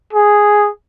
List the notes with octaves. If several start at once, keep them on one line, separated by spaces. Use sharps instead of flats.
G#4